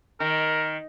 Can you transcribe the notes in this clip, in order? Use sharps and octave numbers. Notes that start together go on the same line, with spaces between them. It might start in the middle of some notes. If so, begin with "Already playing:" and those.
D#3 A#4